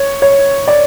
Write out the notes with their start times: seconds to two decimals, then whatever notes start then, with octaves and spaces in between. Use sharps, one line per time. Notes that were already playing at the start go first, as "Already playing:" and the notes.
Already playing: C#5
0.22 C#5
0.68 D5